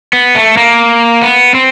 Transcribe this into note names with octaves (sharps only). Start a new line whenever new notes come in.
B3
A3
A#3
B3
C4